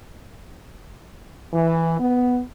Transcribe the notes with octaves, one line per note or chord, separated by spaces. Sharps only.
E3
B3